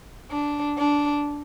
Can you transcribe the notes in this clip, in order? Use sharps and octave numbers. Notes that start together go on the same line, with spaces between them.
D4
D4